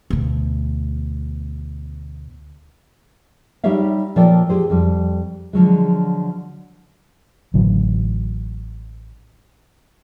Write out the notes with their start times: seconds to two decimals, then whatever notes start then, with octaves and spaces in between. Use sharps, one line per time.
0.10 D2 B2
3.64 G3 D#4 G4 C#5 E5 F5
4.16 A#2 F3 A4 C#5 D5 G5
4.49 F3 G4 G#4 C5
4.70 F2 G3
5.53 D3 F3 F#3 G#3
7.54 A1 D3 F#3